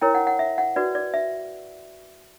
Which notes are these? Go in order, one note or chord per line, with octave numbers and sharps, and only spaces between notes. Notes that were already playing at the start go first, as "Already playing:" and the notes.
E4 A#4 C#5 G5
F#5
F#5
E5
F#5
F#4 B4 D5
D5
E5